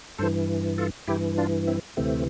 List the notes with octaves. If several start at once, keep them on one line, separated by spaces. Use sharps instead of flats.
G2 E3 A4 C5
F4 A4
G2 E3 E4 G4
D4 F4
C4 E4
D2 C3 E3 A3 C4